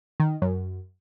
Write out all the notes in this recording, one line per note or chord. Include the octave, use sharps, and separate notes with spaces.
D#3
F#2